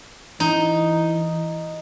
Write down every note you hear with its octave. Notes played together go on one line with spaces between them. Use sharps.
E3 D#4